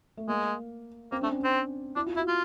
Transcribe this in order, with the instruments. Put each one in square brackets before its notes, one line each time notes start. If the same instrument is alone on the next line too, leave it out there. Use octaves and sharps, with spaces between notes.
[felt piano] A3
[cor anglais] G#3 [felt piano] A#3
[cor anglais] A#3 [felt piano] C4
[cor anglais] A3 [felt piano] D4
[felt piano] C#4
[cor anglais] C4 [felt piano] D4
[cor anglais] D4 [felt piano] E4
[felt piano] F4
[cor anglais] E4 [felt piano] F#4
[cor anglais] F4